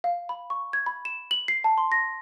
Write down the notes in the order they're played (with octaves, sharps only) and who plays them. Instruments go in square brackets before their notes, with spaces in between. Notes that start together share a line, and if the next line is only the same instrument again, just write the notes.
[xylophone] F5
B5
C#6
G#6
B5
E7
F#7
C7
A5
C6
A#6